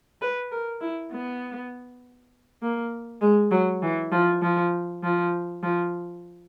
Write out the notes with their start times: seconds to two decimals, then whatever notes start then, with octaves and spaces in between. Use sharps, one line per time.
0.22 B4
0.52 A#4
0.81 E4
1.12 B3
2.62 A#3
3.22 G#3
3.52 F#3
3.83 E3
4.12 F3
4.42 F3
5.03 F3
5.63 F3